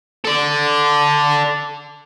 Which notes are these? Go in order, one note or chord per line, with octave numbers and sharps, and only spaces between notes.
A4 D5